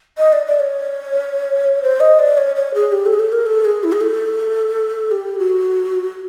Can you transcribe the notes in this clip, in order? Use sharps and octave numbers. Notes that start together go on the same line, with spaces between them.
D#5
D5
D5
C#5
C5
D#5
D5
C#5
C#5
G#4
G4
A4
G#4
A4
A#4
A4
G#4
E4
G#4
A4
G4
F#4